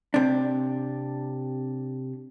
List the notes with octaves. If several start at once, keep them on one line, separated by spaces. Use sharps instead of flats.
C3 D4